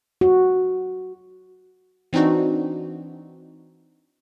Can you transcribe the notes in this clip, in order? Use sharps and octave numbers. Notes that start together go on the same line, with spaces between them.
F#4
E3 C4 D4 D#4 F#4